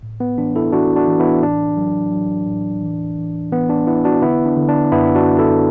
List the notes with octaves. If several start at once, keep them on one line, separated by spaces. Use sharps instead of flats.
A2
B3
E3 D4
E4 A4
E3 D4 F#4
D4 F#4
E3
B3 E4
A2 D4
F#3
F#3
A2
E3
E3
E3 B3
D4
E3 B3 E4
D4 F#4
D3 B3 E4
D4
D3
D4
F#2 B3 E4
D4 F#4
F#2
E4 A4